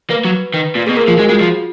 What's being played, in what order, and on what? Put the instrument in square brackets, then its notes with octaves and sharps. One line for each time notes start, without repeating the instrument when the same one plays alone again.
[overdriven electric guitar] A#3 [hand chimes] B4
[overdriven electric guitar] F#3
[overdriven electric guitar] D#3 [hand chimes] B4
[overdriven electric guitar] A#2
[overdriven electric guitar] B2 [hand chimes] G#4
[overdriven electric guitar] A#2 [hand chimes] A#4
[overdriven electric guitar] F3 [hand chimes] G#4
[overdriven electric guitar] G#3 [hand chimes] F#4
[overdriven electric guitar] G#3 [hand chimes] F4
[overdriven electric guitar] F3